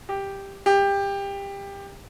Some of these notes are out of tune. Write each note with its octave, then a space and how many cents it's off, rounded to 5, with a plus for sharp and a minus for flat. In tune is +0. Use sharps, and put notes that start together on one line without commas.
G4 +5
G4 +20